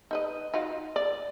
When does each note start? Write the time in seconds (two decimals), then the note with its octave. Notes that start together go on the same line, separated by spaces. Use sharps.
0.11 D#4 B4 D#5
0.54 D#4 F4 F#4
0.96 D5